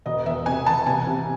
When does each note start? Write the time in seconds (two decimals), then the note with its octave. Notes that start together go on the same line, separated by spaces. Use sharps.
0.06 E1 D#5
0.26 E2 E5
0.46 C3 G#5
0.66 E3 A5
0.86 C2 G#5
1.07 C3